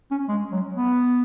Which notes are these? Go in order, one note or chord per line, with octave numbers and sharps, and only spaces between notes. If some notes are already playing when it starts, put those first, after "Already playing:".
C#4
G#3
F#3
B3